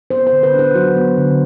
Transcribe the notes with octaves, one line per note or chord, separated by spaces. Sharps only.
B3 C5
C5
D3
B4
D4
B4
F#3 F#4
B3
D3